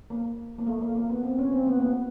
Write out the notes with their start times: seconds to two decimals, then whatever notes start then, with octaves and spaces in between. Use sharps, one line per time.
0.10 A#3
0.59 A#3
0.67 A3
0.81 A#3
0.95 A#3
1.10 B3
1.24 C4
1.39 C#4
1.52 C4
1.67 B3
1.77 A#3
1.80 B3